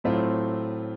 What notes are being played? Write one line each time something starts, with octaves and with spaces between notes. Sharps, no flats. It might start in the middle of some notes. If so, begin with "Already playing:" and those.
A2 F#3 A3 C4 F4